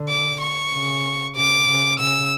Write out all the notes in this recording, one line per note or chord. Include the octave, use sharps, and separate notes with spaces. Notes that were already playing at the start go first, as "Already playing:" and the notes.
Already playing: D3
D6
C#6
C#3
C#3 D6
C#3
C#3 E6